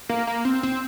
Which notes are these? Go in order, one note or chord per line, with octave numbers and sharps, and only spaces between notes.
A#3
A#3
C4
C4